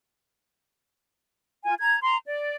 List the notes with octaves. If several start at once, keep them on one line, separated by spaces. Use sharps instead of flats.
F4 G#5
A#5 G#6
A#5 C6
D5